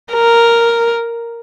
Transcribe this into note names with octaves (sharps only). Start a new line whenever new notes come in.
A#4